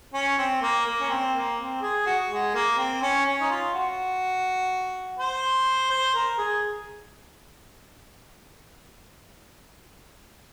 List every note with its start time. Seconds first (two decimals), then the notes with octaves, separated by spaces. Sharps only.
0.14 C#4
0.38 C4
0.62 A#3
0.86 A#3
1.01 C#4
1.10 C4
1.34 A#3
1.59 C4
1.82 G#4
2.06 F#4
2.30 G#3
2.55 A#3
2.78 C4
3.02 C#4
3.26 C#4
3.41 D#4
3.50 F4
3.74 F#4
5.19 C5
5.91 C5
6.14 A#4
6.38 G#4